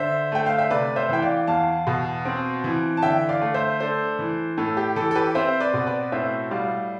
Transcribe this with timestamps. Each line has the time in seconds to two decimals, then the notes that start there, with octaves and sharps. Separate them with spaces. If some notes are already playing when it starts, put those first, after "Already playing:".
Already playing: D3 C5 E5
0.32 A3 G5
0.46 F5
0.58 E5
0.71 C3 B4 D5
0.96 C5 E5
1.09 E3 G5
1.22 D5 F5
1.47 E2 F5 A5
1.87 B2
2.25 C4
2.64 E3
2.97 A5
3.02 D3 E5 G5
3.29 D5 F5
3.41 A3
3.54 C5 E5
3.80 D4 A4 C5
4.19 E3
4.58 A2 A4
4.77 G4
4.96 E3 A4
5.11 A4
5.15 G4 B4
5.35 C4 C5 E5
5.60 B4 D5
5.74 B2
5.86 B4 D5
6.12 A2 C5 E5
6.51 G3 D5 F5